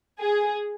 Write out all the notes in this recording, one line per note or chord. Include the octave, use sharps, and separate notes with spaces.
G#4